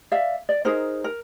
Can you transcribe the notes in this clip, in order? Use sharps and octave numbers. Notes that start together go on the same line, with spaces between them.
D5 E5 F5
D5
D#4 G#4 A#4 C5
A#4